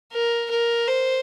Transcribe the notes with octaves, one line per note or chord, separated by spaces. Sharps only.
A#4
A#4
C5